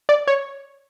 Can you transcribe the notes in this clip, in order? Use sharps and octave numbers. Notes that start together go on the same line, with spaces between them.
D5
C#5